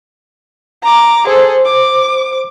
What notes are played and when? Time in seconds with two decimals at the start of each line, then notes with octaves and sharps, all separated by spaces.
0.83 A#5 D6
1.27 G#4 A4 C5
1.65 D6